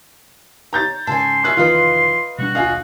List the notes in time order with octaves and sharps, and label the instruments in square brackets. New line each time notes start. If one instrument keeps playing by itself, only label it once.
[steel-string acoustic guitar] C#5 [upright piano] A#5 G6 A6
[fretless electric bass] G#2 C#3 [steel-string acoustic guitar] A4 G#5 [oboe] C6
[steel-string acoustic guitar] D#3 C#4 E5 [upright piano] F#6
[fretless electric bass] F1 D#3 E3 [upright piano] F4 [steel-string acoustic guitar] B4 D#5 F5
[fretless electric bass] B2 G3 D4 [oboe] F#4
[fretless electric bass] D#1 B1 D4 [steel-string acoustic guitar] F4 G#4 D#5 [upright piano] F5